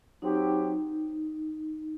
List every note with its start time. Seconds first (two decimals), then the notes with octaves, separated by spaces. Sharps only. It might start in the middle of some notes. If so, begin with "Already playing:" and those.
0.22 F#3 C4 D#4 G4